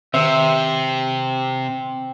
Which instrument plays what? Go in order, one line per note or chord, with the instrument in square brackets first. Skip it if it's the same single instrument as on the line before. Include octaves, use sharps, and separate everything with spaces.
[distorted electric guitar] C3 [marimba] D#3 [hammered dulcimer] C4 [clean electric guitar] E5